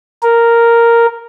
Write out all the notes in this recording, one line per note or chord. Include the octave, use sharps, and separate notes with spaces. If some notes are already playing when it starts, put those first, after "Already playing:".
A#4